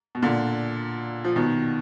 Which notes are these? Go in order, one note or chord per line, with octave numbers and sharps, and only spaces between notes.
B2
A#2 D3
F3
B2 D#3